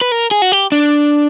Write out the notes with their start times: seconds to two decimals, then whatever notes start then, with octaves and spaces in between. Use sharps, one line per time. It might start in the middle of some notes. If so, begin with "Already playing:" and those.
0.01 B4
0.12 A#4
0.31 G#4
0.42 F#4
0.52 G4
0.72 D4